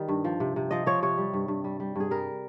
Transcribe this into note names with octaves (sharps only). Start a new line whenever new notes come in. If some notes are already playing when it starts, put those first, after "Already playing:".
Already playing: D#3 G3
G2
F3
C3
C3
F3 D#5
F3 C#5
C3 C#5
G3
G2
G2
G3
G3
G2 G#4
G3 A#4